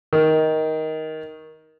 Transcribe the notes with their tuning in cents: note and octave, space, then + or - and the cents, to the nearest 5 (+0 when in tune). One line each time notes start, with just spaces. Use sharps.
D#3 +10